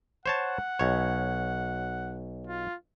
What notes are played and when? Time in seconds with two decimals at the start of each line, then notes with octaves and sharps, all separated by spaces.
0.26 C5 C#5 F#5 A5
0.79 B1 C#5
2.47 F4